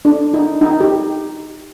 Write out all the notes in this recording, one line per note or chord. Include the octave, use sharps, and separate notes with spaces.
D4
D#4
D#4
G4